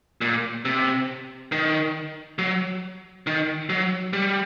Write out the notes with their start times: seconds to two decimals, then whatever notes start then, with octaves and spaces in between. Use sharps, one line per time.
0.21 A#2
0.65 C3
1.52 D#3
2.39 F#3
3.27 D#3
3.69 F#3
4.13 G3